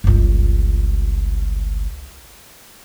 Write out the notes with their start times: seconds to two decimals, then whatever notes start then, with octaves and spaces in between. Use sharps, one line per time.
0.04 G1 C#2